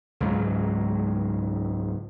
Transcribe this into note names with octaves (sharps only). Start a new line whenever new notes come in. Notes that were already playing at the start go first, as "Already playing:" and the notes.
C#2 G#2 F#3